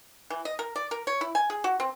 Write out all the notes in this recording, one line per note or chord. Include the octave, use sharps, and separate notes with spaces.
E3
D#5
A#4
D5
A#4
C#5
E4
G#5
G#4
F#4
C4